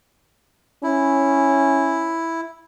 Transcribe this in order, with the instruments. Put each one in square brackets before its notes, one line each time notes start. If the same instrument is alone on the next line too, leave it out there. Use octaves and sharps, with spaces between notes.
[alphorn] C#4 [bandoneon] E4